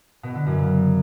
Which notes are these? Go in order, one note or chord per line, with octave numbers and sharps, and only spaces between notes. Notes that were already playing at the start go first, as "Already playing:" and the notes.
B2
D3
F#2
C#3